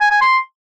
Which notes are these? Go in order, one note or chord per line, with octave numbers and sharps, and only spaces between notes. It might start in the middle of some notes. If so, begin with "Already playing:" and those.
G#5
G#5
C6